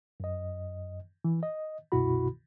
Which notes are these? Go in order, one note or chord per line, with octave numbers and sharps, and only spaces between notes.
F#2 D#5
E3
D#5
C2 F#2 B2 E4 F#4 B5